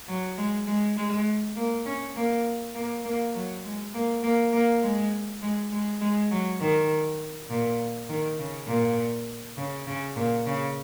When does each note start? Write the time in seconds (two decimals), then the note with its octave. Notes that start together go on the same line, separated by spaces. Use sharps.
0.08 F#3
0.38 G#3
0.67 G#3
0.97 G#3
1.56 A#3
1.86 C#4
2.16 A#3
2.75 A#3
3.05 A#3
3.34 F#3
3.64 G#3
3.94 A#3
4.23 A#3
4.53 A#3
4.83 G#3
5.42 G#3
5.71 G#3
6.01 G#3
6.31 F#3
6.61 D#3
7.50 A#2
8.09 D#3
8.39 C#3
8.68 A#2
9.57 C#3
9.87 C#3
10.16 A#2
10.46 C#3